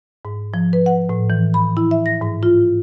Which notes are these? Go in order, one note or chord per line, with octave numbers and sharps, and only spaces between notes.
G#2
F3
B4
F#5
A2
E3
B5
E4
E5
A#6
G#2
F4